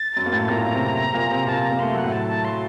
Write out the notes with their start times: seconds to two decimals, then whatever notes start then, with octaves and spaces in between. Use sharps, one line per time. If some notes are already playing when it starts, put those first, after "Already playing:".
Already playing: A6
0.17 F#2 F#3
0.26 A#3
0.32 A2 A3
0.49 A#2 A#3 A#5
0.67 A#3
0.74 C3 C4
1.14 A#2 A#3
1.31 C3 C4
1.46 A#2 A#3 A5
1.63 A#5
1.71 A#3
1.79 A3 C6
1.93 F#3 F#5
2.03 A2 A3
2.12 A5
2.28 A5
2.44 F#3 C6